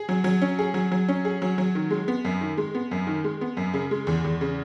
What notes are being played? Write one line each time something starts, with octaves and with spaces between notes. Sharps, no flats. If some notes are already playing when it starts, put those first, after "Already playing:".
Already playing: G#4
F#3
F#3
C#4
G#4
F#3
F#3
C#4
G#4
F#3
F#3
D#3
G#3
B3
F#2
D#3
G#3
B3
F#2
D#3
G#3
B3
F#2
C#3
G#3
E2
E2
C#3